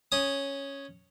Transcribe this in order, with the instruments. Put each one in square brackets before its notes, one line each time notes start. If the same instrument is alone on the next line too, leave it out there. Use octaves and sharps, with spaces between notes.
[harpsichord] C#4 D#6